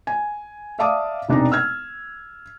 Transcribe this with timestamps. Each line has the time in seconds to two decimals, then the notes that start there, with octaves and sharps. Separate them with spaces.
0.07 G#5
0.79 D5 E5 F5 A5 D6 D#6
1.29 E1 C3 D4 D#4 D5 A#5
1.52 E6 F6 G#6